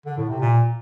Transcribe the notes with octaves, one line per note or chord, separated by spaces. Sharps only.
D3
A2
C3
A#2